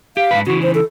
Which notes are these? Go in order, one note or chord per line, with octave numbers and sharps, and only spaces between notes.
G4 F5
G#2 C#3 B4
C#3 E3 F#4
C5
A4